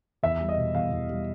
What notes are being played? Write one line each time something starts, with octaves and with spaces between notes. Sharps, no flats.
E2 E5
G3
D#5
B2
E2 F5
E2
G3